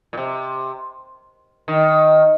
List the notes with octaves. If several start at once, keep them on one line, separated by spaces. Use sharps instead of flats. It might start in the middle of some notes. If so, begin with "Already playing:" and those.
A#2
C3
D#3